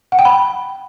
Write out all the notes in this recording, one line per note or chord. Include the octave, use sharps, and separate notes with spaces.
F#5
G5
B5